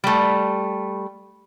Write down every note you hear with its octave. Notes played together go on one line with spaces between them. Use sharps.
G3 A3